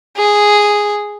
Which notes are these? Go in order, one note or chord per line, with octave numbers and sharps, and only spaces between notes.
G#4